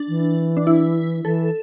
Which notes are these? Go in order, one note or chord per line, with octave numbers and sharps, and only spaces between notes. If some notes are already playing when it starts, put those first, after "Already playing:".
Already playing: D4
E3
D4
E4
E3 A4